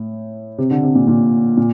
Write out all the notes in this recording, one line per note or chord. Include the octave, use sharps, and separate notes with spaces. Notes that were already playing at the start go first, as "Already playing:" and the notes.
Already playing: A2
C3
D3
C3
A#2
A#2
A#2